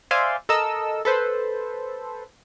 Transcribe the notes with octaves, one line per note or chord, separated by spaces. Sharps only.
C5 D5 E5 F5 G#5 C6
A4 A#4 D#5 E6
A4 B4 C5